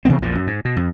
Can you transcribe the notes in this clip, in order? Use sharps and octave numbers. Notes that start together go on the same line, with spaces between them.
C3 E3 B3 C4
A#1 E2 A#2 F3
F#2
G#2
B2
F2